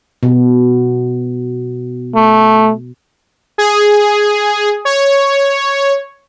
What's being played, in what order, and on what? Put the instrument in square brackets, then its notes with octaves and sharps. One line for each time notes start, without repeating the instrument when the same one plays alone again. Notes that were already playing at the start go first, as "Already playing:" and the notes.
[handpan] B2
[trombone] A3
[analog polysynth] G#4
C#5